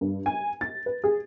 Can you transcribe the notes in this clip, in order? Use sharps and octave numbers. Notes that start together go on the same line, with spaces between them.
G2
G#5
A6
B4
G#4